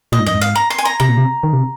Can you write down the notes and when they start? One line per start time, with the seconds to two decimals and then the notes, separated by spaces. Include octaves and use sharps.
0.12 A#2 D#5
0.19 G#2
0.26 F2 D#5
0.34 G#2
0.41 F5
0.55 A#5
0.70 C6
0.78 G#5
0.85 A#5
1.00 C3 A#5
1.09 A#2
1.17 C3
1.43 D#3
1.53 C3